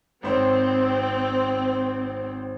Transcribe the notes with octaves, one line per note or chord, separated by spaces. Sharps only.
G#1 C4 C5 C#5